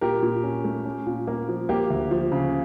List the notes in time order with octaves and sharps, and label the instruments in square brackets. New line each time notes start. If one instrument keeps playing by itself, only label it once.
[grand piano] A#2 G4 A#4
A#2
C#4
A3
C#4
A#2
A#3
F3
A#3 G4
D2
F3
C#3